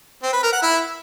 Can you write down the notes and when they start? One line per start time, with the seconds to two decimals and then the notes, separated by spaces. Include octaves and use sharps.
0.23 C4
0.33 B4
0.43 A#4
0.53 F#5
0.63 E4